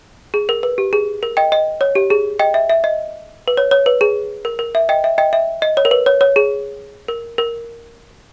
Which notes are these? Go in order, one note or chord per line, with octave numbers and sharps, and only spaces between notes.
G#4
A#4
B4
G4
G#4
A#4
D#5 G5
D#5
C#5
G4
G#4
D#5 G5
E5
E5
D#5
B4
C#5
C#5
B4
G#4
A#4
A#4
E5
D#5 G5
E5
D#5 G5
E5
D#5
C#5
A#4
B4
C#5
C#5
G#4
A#4
A#4